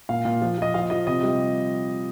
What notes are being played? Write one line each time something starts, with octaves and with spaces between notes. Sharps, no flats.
A#2 F5
A#2
F3
F3 D#5
F3 F5
F3 D#5
C3 D#5
G3